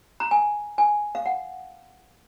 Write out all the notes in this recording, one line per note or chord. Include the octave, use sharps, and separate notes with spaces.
A#5
G#5
G#5
F5
F#5